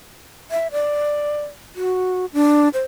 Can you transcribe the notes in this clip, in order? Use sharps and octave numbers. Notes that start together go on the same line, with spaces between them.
E5
D5
F#4
D4
C5